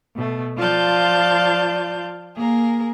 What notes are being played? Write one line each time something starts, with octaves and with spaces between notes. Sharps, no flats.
B2 A3
F3 F4 D5 F5 A5 G6
A#3 G#4 A#4